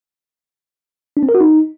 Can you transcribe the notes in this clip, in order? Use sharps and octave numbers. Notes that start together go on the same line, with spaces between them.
D4
C4
A#4
F#4
D#4